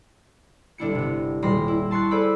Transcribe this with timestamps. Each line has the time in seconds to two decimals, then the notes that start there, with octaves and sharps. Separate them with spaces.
0.78 G1 D4 E4 C#7
0.95 C3 B3
1.42 D#1 G3 B5 C6 A#6
1.68 E4
1.91 A5 C6 C#6 F#6 A6
2.11 G#4 A4 C5 D5 B5 E6